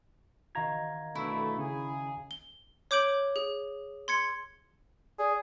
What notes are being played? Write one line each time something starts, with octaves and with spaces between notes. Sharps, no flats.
D#3 F#4 F5 A#5 G#6
B2 D3 A3 E4 C#6 E6 D7
C#3 G#4
G7
C#5 D6 G6 D7 F#7
G#4
C6 G#6 C#7
G#4 D5